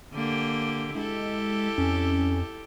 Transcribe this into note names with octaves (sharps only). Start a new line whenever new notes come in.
D3 A#3 G4
G#3 E4 G4 A4
F2 C#4